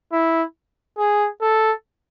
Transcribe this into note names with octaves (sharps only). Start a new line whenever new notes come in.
E4
G#4
A4